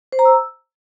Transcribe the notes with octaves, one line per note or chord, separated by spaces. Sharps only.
C5
A#5
E6